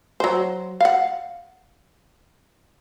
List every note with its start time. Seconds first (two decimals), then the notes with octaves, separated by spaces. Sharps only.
0.20 F#3 C5
0.81 F5 F#5